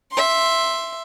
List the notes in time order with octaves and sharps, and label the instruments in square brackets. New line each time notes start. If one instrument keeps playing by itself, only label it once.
[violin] E5 C6